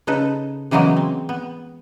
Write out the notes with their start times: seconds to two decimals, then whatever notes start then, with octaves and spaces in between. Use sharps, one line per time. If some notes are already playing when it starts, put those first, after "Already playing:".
0.07 C#3 D#4 A4 B4
0.71 C#3 E3 F#3 G#3 A#3 B3
0.97 C4
1.29 B3